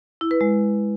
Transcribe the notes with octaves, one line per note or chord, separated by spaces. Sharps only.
E4
B4
G#3